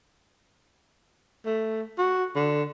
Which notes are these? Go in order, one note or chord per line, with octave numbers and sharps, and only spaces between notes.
A3
F#4
D3